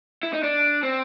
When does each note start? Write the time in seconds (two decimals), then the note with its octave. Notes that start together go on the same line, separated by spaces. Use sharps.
0.23 E4
0.33 D#4
0.43 D4
0.83 C4